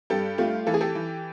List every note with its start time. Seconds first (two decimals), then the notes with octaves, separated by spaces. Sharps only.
0.10 G2 G4 A4
0.38 A3 F4 G4
0.67 E3 A4
0.74 G#4
0.81 G4 A4
0.95 E3